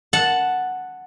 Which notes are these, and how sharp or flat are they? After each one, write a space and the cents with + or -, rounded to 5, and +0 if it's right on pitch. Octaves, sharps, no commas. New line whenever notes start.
F#5 +0 A5 +0